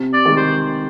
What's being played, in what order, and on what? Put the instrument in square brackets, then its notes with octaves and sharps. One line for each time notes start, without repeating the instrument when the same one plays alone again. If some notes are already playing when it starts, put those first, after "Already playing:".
Already playing: [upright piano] C3
[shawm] D5
[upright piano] D#3 G#3
[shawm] C5